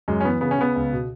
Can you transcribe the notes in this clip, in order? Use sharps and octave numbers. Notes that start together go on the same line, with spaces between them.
F#2 G#3
C#4
E3 B3
C#3 B3
C#4
C#3 B3
C#2
B2